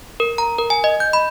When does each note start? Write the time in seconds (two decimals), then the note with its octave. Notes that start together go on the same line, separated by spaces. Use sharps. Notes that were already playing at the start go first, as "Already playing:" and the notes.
0.20 A#4
0.38 A#5
0.58 A#4
0.70 G#5
0.84 D#5
1.00 G6
1.13 B5